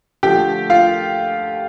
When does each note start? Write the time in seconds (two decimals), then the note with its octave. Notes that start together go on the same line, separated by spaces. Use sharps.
0.23 D3 F3 A3 G4 G5
0.70 F4 F5